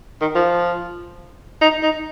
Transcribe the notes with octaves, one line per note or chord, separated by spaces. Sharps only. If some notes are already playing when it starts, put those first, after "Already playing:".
D#3
F3
D#4
D#4